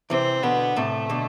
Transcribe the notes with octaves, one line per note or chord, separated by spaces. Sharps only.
C3 E3 C4
B2 D3 B3
A2 C3 A3
B2 D3